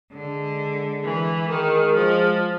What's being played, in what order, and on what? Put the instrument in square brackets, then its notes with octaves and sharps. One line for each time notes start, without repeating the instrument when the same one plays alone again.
[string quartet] D3 [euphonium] G#3
[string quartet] E3
[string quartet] D#3 [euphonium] G#3
[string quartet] F3